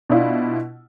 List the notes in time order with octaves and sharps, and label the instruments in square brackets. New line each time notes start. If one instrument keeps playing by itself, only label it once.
[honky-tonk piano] B2 D4 E4 F4